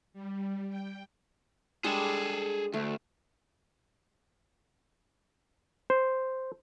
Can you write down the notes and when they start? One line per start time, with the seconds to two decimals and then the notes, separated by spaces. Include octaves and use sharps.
0.13 G3
0.69 G5
1.84 G3 G#3 D4 G#4 A4
2.74 D2 A3
5.90 C5